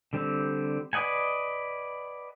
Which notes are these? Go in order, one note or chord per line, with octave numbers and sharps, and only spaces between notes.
D3 G3 C4
B4 D5 D#5 F#5 G#5